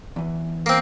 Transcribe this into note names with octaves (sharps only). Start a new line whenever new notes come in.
E2 E3
A#3 C4